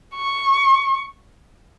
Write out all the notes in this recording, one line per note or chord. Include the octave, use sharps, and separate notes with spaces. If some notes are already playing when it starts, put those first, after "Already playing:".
C#6